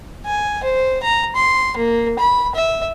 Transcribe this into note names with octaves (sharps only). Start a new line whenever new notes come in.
G#5
C5
A#5
C6
A#3
B5
E5